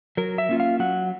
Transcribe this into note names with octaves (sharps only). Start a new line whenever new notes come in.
F#3 A#4
E5
A#3 C#4 F4
F5
F#3 F#5